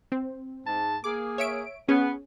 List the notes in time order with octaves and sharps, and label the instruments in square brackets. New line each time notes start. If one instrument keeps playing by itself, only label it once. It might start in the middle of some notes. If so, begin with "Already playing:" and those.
[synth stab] C4
[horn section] G#2 A5
[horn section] A#3 G#4 [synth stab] D6
[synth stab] C#5 E5 D7
[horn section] B3 [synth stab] C#4 G#4